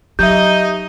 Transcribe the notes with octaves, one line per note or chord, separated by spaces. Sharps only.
F#3 D#4 G4 D#5 E5 G6